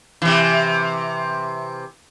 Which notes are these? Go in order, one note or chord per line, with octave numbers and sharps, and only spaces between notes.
C3 E3